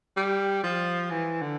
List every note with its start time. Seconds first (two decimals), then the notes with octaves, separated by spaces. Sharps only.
0.17 G3
0.64 F3
1.10 E3
1.41 D3